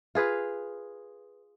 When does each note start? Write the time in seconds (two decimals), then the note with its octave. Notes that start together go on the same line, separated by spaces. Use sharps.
0.15 F4 G#4 B4 F5